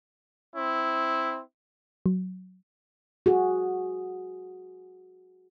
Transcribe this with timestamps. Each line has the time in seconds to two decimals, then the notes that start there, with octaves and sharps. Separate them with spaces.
0.55 C4 E4
2.06 F#3
3.26 F#4 G#4